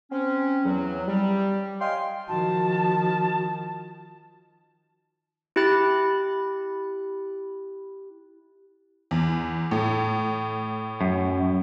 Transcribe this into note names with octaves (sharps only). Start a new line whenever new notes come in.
C4 C#4
E2 F#3
G3
C#5 D#5 F5 G5 G#5 C6
D#3 F3 F#4 A5
E4 G4 B5 F#6 A6
E2
A2
F#2